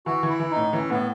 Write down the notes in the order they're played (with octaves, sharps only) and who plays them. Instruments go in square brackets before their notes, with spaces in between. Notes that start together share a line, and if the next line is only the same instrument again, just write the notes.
[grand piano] E3 [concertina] F#4
[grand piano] E3
[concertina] E4
[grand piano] E3
[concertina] D#4
[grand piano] A2
[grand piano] E3 [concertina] C#4
[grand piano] A2 [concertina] B3